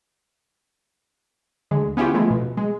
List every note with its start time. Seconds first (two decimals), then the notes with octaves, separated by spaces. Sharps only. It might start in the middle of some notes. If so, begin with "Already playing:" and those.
1.71 D2 D3 G#3
1.97 B3 C#4 E4 F4 G4
2.14 F3 G#3 A3
2.30 B2
2.57 G#3